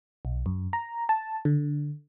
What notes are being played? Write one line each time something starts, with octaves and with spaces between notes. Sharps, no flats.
B1
F#2
A#5
A5
D3